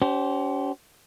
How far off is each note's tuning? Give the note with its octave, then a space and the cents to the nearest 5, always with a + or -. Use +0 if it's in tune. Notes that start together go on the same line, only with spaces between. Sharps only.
C#4 +30 G4 -40 C5 +0